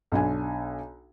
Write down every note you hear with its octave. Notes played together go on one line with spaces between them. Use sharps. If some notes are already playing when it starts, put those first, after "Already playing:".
B1 D4 G#5